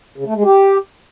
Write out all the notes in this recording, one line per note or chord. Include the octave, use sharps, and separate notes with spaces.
C#3
A3
G#3
G4